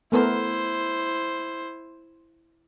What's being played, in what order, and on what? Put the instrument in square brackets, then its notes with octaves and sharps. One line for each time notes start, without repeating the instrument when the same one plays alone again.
[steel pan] A3 B3 A#4 [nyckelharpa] E4 C5